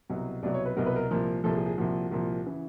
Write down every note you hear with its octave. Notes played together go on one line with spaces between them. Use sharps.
C2 B2 F#3
C2 B2 F#3 D5
C#5
B4
C2 B2 F#3 A#4
B4
A#4
C2 A#2 F3
C2 A#2 F3 A4
G#4
G#4
C2 A#2 F3 F#4
C2 A#2 F3
C#3 E3